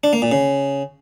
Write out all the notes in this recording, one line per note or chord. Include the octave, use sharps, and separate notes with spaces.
D4
A#3
A#2
C#3